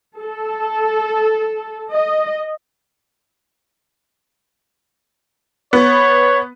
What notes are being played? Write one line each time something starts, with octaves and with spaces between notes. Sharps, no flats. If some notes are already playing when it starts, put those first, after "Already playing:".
A4
D#5
B3 C#5